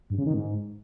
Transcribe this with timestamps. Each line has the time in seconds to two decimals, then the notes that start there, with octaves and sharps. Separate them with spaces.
0.10 G2
0.18 C#3
0.26 D#3
0.34 G#2